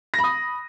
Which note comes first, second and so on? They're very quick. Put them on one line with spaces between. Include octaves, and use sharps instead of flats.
A#6 B5 D#6